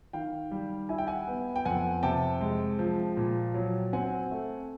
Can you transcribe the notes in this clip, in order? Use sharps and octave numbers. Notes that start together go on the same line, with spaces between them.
D#3 F5 G5
G3
E4 G#5
G5
F#5 G#5
B3
G5
F2 F#5 G#5
C3 G5 A5
G#3
F3
A#2
F#3
C4 F#5 G#5
A3